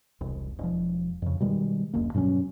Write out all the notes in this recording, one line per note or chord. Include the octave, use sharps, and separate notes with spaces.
E1 C2
E1 F3
F2 C#3
B2 D#3 G3 G#3
F#1 D2 A#3
G2 B2 F#3 C#4